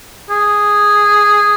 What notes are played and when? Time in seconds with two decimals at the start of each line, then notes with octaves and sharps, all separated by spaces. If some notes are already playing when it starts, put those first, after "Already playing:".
0.30 G#4